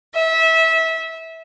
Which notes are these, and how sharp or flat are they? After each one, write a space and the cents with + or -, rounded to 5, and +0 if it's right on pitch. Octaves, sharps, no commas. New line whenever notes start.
E5 -20